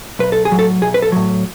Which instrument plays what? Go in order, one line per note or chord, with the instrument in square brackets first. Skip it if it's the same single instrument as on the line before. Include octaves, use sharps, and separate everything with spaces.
[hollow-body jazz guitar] B1 B4
A4
G#4
A2 F#3
A4
B1 G#4
B4
A4
A2 F#3